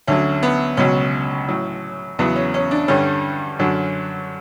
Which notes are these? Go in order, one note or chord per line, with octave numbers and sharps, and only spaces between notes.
D2 D3 F#3 C#4
B3
C#2 B2 F#3 C#4
A2 F#3
E2 C#3 F#3 B3
C#4
C#4
D4
G2 D3 G3 C#4
F#2 D3 F#3